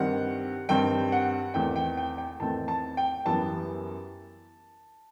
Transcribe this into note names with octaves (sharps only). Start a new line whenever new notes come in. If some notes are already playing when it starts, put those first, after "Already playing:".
Already playing: G2 D#3 G3 C4 F#5
G2 D#3 G3 C4 G5
F#5
E2 D#3 A3 C4 G5
G5
G5
G5
E2 D#3 A3 C4 A5
A5
G5
F#2 E3 G3 B3 A5